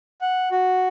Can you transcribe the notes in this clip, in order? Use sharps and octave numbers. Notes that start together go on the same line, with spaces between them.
F#5
F#4